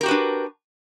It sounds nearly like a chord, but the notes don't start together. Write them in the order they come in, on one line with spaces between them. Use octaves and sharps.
A#4 G4 F#4 B4 D4